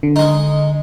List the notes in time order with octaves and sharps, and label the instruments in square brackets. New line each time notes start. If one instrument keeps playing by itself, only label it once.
[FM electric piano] D3
[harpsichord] G#3 D#4